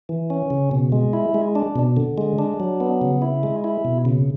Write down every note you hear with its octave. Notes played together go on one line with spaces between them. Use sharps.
E3
C#4
C#3
B2
G#3
E4
G#3
D4
B2
D3
G#3
D4
F#3
B3
C#3
E4
G#3
E4
B2
C#3